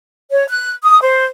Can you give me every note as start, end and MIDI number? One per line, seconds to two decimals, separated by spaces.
0.31 0.44 73
0.49 0.72 90
0.83 0.98 87
1.02 1.25 72